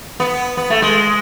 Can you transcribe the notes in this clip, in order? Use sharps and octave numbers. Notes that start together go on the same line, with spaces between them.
B3
B3
A3
G#3